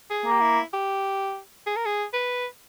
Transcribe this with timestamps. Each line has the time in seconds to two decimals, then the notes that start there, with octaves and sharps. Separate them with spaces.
0.10 G#4
0.26 A#3
0.32 G4
0.41 E4
0.73 G4
1.66 G#4
1.76 A#4
1.85 G#4
2.13 B4